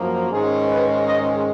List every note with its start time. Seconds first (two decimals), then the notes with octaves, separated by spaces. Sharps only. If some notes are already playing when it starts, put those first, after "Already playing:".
Already playing: F#2 F3 A#3
0.29 G#2 D#3 G#3 C#4 G#4
0.68 B4
1.07 D#5